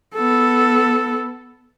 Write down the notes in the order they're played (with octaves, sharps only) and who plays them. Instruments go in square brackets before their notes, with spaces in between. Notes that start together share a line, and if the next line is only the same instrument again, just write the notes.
[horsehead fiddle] B3 A4